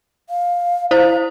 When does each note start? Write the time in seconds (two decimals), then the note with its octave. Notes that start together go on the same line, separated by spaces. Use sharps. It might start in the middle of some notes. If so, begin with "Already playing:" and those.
0.30 F5
0.91 E4 C5 F5